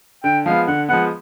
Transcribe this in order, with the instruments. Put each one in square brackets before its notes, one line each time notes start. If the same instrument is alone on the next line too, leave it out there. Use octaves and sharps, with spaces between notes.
[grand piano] D3 [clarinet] G5
[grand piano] F3 G#3 B3 [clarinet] F5
[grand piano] D3 [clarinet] F#5
[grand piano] F3 G#3 B3 [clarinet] F#5